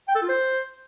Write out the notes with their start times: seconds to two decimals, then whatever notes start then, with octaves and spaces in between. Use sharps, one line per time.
0.08 G5
0.15 A4
0.22 F4
0.29 C5